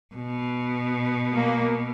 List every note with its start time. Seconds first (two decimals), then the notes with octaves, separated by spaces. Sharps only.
0.15 B2
1.33 A#3